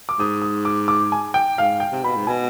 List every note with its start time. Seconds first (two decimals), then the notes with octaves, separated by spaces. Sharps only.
0.09 D6
0.19 G#2 D#6
0.42 D#6
0.65 D6
0.88 D6
1.12 G#5
1.34 G5
1.58 G#2 F5
1.80 G5
1.92 C3
2.04 B2 B5
2.16 G#2
2.27 B2 G#5